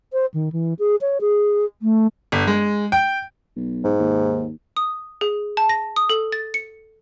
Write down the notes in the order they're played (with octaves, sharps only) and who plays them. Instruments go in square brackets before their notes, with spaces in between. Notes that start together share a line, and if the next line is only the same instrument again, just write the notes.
[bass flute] C5
D#3
E3
G#4
C#5
G#4
A3
[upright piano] G1
G#3
G5
[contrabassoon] B1
[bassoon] G#2
[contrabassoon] D#2
[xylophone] D#6
G#4
A5
A#6
D#6
A4
A6
C#7